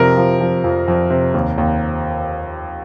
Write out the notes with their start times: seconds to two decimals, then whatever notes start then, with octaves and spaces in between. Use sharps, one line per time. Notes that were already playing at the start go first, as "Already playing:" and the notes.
Already playing: F2 C3 F3 A#4
0.17 F3
0.41 F3
0.64 F2
0.88 F2
1.10 C3
1.34 D#2
1.58 D#2